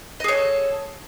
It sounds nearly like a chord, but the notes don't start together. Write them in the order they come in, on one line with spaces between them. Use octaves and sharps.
D#5 G#4 C#5 A4